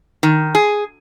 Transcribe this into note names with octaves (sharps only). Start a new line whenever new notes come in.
D#3
G#4